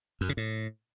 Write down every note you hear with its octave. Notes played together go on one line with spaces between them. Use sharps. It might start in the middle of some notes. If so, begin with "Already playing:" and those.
F#2
C#3
A2